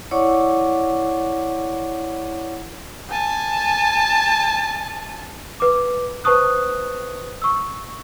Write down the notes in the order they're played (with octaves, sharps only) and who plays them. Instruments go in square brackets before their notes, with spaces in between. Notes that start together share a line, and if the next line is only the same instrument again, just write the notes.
[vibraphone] E4 C#5 D5 F#5 C#6 D6
[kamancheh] G#5 A5
[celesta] B4 D6
B4 C5 A5 C#6 D#6 F#6
C#6 E6